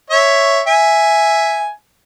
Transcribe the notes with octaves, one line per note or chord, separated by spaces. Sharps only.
C#5 E5
E5 G#5